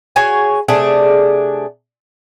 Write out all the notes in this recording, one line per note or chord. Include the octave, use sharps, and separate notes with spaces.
F#4 G#4 C#5 G#5
C3 A3 D4 G#4